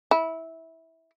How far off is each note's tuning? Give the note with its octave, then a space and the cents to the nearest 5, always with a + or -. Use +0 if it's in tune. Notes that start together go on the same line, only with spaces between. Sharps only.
E4 -15